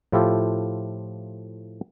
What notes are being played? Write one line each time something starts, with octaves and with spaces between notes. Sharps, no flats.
A2 F3 E4 F4 G4 A4